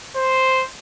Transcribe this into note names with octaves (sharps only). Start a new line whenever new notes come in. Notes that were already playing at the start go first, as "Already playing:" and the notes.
C5